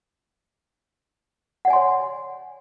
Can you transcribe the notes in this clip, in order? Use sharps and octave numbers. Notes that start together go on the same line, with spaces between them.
C#5 D5 F#5 G#5 C6